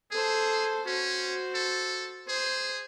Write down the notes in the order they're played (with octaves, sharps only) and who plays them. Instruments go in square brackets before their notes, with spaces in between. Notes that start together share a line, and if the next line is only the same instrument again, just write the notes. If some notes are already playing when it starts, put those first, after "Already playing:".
[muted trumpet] G#4 [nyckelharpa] A4 C5
[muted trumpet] C#4 [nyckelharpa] F#4 C5
[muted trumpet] A4
[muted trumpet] G#4 [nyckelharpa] C5